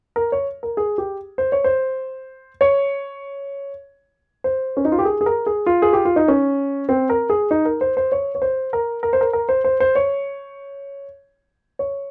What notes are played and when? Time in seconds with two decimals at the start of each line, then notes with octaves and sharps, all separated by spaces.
0.16 A#4
0.32 C#5
0.63 A#4
0.77 G#4
0.98 G4
1.38 C5
1.52 C#5
1.64 C5
2.61 C#5
4.44 C5
4.77 C#4
4.85 D#4
4.92 F4
4.98 G4
5.05 G#4
5.21 G#4
5.26 A#4
5.46 G#4
5.66 F4
5.82 G#4
5.93 G4
6.05 F4
6.16 D#4
6.28 C#4
6.89 C4
7.10 A#4
7.30 G#4
7.51 D#4
7.65 A#4
7.81 C5
7.97 C5
8.12 C#5
8.35 C#5
8.42 C5
8.73 A#4
9.03 A#4
9.13 C5
9.21 A#4
9.33 A#4
9.49 C5
9.64 C5
9.80 C5
9.95 C#5
11.79 C#5